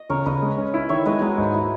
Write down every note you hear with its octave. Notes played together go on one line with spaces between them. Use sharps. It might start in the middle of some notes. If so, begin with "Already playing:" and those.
Already playing: D#5
C#3 A#4 C#5
C#3 B4 D#5
G#3
C#4
E4
D#3 C#5 E5
G#3 B4 D#5
G#3 D#4 F#4
G#2
E4